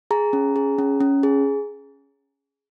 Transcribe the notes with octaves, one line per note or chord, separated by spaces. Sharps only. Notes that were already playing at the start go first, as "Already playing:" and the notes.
G#4 A#5
C#4
G#4
C#4
C#4
G#4